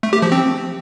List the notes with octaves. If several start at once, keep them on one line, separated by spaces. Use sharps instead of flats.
A3
G4
F3
C4